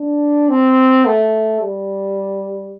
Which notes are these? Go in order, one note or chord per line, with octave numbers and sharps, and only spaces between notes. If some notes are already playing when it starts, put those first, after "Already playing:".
Already playing: D4
C4
A3
G3